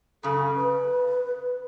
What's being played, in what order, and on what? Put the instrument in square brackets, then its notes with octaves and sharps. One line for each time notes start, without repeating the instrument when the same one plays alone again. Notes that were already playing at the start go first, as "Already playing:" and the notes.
[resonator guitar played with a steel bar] F#2 C#3 [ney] A4
[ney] B4